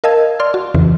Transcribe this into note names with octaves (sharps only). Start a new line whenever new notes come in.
A#4 D#5 F5 A5 E6 G#6
D5 C6 F6
F#4
F2 C#3 E3